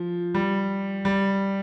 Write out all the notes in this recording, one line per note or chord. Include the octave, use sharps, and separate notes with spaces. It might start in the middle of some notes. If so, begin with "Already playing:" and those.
Already playing: F3
G3
G3